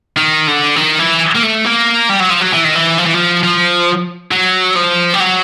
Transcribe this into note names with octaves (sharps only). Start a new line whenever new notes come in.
D#3
D3
D#3
E3
A#3
A3
A#3
G3
F#3
F3
F#3
E3
D#3
E3
F3
E3
F3
F3
F#3
F3
G3
F#3